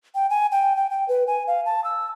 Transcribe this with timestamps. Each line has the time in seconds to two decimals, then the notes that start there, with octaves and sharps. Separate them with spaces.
0.15 G5
0.30 G#5
0.52 G5
0.76 G5
0.90 G5
1.08 B4
1.27 G#5
1.47 F5
1.66 A5
1.84 E6